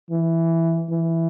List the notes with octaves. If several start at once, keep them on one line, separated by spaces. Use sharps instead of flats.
E3
E3